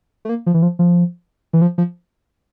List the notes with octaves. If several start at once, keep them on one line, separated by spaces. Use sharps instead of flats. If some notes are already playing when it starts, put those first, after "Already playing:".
A3
A#3
F3
E3
F3
F3
E3
F3
F3